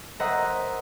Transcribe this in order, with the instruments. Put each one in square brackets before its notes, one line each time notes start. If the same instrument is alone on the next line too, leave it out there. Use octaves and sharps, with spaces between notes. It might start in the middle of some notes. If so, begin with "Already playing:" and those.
[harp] A#4 C5 D#5 E5 F#5 A#5